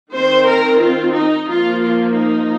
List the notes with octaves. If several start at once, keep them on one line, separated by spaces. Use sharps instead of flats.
D#3 C4 C5
A#4
F4
D#4
F3 A#3 F4
F4
D#4